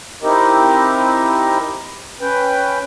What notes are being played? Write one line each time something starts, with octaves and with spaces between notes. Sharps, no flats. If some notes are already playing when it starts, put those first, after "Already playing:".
C4 D#4 E4 G4 A#4 D#5
C#4 B4 G5